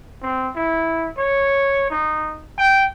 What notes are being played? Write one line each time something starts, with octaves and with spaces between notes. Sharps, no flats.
C4
E4
C#5
D#4
G5